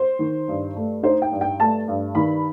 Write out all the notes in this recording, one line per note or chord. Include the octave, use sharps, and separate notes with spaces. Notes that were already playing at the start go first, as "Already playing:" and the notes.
Already playing: C5
D#3
G2
A3
D#4 C5
G5
G2
G5
A3 A5
G2
D#3 B5